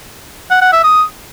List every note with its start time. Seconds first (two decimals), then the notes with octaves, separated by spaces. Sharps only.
0.51 F#5
0.62 F#5
0.72 E5
0.83 D#6